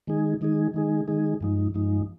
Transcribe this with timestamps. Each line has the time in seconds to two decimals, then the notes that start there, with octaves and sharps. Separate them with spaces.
0.07 D#3 G#3 D#4 G#4
0.41 D#3 G#3 D#4 G#4
0.74 D#3 G#3 D#4 G#4
1.08 D#3 G#3 D#4 G#4
1.41 G2 F3 G#3 D#4
1.74 G2 F3 G#3 D#4